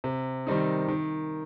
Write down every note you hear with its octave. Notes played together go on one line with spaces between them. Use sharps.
C3
D#3 G3 C4 D#4
D#3